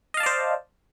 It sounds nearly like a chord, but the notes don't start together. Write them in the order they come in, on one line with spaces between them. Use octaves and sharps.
D#5 F5 A5 D5 C5